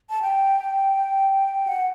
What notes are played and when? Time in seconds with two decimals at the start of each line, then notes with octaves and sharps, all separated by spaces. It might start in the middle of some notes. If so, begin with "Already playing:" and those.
0.10 A5
0.22 G5
1.67 F#5